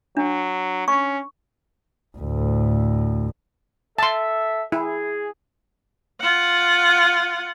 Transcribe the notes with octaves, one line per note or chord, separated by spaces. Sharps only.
F#3 D4
C#4 C#6
D2 A2
A4 E5 A5 C6
E4 G#4
F4 F#5